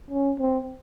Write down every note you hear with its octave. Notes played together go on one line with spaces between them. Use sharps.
C#4
C4